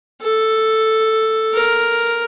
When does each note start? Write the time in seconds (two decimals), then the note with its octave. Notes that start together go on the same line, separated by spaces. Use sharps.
0.22 A4
1.54 A#4